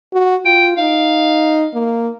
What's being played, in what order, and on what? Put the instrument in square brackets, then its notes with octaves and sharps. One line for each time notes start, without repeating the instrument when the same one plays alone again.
[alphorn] F#4
[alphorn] F4 [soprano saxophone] G5
[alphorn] D#4 [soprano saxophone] F5
[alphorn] A#3